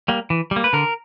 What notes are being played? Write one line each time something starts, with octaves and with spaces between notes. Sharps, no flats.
G3 A#3
E3
G3
A#3
B4
D3 A#4